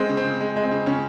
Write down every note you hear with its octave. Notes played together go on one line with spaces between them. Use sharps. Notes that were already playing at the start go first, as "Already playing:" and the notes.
Already playing: G#3 C4
C#3
C4
C#3
G#3
G#3
C4
C#3
C#3 C#4